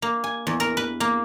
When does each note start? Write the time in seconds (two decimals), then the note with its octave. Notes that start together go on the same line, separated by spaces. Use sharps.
0.02 A#3
0.24 G#5
0.47 E2
0.60 A#4
0.77 B4
1.00 A#3